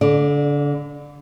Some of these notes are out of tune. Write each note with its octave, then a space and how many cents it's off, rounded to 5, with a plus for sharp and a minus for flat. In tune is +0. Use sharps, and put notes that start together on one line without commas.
D3 -30 D5 +10